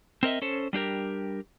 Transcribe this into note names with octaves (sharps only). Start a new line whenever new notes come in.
C4 A#4 D#5 E5
C#4 A4 C5
G3 D4 G4 A#4